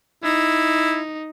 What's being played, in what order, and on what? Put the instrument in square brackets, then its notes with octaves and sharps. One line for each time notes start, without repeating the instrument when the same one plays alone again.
[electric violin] D#4 [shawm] E4